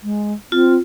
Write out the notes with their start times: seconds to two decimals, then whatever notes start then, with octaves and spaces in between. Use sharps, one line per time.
0.03 G#3
0.52 C4 F4